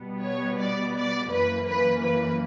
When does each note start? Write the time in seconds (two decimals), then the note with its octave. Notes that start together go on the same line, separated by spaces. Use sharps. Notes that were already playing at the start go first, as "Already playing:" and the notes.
Already playing: B2 G3 B3
0.24 C#5
0.60 D5
0.96 D5
1.32 F#2 E3 A#3 B4
1.68 B4
2.04 B4